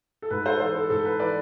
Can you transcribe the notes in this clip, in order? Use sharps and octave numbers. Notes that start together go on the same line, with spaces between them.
A4
G#2 B4
A4 C5
E3 A4 C5
A4
G#2 A4
B4
E3 B4 D5